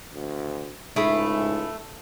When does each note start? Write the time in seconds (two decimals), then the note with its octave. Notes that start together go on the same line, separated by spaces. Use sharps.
0.14 D2
0.96 C#2 G#2 A3 E4 G#4 B5